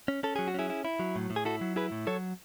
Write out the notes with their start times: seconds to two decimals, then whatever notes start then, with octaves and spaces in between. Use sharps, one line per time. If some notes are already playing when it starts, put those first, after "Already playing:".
0.08 C#4
0.23 C#4 A4
0.36 F#3 G#4
0.48 F#4
0.54 C#4 E4 G#4
0.70 E4
0.85 E4
1.00 F#3
1.16 A2
1.30 A2
1.36 G#4
1.45 E4 F#4 A4
1.61 F#3
1.76 E4 G#4 B4
1.92 A2
2.07 F#3 A4 C#5